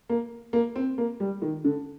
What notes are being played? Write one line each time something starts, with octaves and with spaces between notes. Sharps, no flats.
A#3
A#3
C4
A#3
G3
D#3
D3